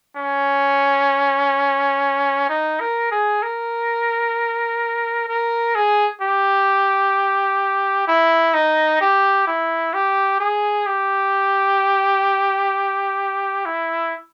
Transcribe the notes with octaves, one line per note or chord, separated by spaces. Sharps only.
C#4
D#4
A#4
G#4
A#4
A#4
G#4
G4
E4
D#4
G4
E4
G4
G#4
G4
E4